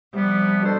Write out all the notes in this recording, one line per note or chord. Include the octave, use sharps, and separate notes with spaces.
C3 F3 G3 B3
B2 G3 D4 A4 C5